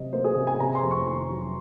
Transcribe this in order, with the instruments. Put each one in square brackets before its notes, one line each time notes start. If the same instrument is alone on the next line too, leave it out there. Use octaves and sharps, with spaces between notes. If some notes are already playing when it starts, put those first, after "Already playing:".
Already playing: [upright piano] C3 F#3 D#5
A#3 C5
G#4
C3
G#5
C3 A#5
C6
F2
C#6
D#3 C#6
F#3